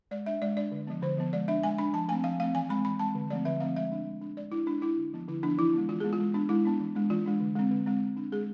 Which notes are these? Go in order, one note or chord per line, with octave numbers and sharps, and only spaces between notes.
G#3 D5
D4 E5
G#3 D5
D4 D5
D3
F3 B3
D3 C5
F3 B3
G#3 D5
D4 E5
G#3 G#5
D4 B5
F3 A5
A3 C4 G#5
F3 F5
A3 C4 F5
E3 G#5
G#3 C4 B5
E3 B5
G#3 C4 A5
D3
F3 A3 C4 D5
D3 E5
F3 A3 C4 F5
G#3 E5
D4
G#3
D4
G#3 D5
D4 E4
G#3 D4
D4 E4
D3
F3 B3
D3 E4
F3 B3 D4
E3 E4
G#3 B3
E3 F4
G#3 B3 G#4
F4
G#3
B3 D4
G#3 E4
B3 D4
E3
G#3 D4
E3 F4
G#3 D4
D3
G#3 C4
D3
G#3 C4
G#3
D4
G#3 G#4